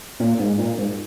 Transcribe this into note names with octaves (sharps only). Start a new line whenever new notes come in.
A#2
G#2
A#2
G#2